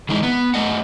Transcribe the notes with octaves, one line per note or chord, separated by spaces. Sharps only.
E3 G#3 D#4 E4
B3
A3 D#5 F#5